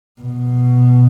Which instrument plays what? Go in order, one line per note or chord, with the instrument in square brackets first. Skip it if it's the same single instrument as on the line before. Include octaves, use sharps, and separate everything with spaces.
[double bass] B2